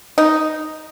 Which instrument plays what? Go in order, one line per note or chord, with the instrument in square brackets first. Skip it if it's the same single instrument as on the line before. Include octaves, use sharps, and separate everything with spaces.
[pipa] D#4